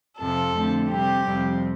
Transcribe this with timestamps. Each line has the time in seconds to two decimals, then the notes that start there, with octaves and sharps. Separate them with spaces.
0.19 F2 C3 F3 C4 A4
0.54 F2 D3 A3 C4
0.90 C3 G3 C4 G4
1.24 F2 C3 G3 C4